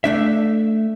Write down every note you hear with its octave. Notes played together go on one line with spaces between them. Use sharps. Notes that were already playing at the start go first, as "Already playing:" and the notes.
A3 D4 E5